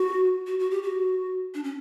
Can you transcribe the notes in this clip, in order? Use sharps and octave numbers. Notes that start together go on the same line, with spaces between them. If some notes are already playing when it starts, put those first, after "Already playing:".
Already playing: F#4
F#4
F#4
G4
F#4
D4
C#4